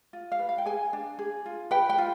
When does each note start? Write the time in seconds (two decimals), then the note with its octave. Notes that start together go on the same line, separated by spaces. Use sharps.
0.13 F4
0.32 F5
0.39 B4
0.49 F5
0.58 G5
0.65 G#4 G#5
0.93 D4
1.19 G#4
1.46 F4
1.71 B4 G5
1.90 G5
1.98 F4